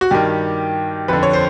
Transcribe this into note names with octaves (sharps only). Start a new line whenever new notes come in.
F#4
G2 D#3 G4
F2 D3 B4
C#5
C5